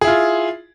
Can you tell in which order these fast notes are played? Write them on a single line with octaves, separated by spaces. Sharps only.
G#4 E4 F4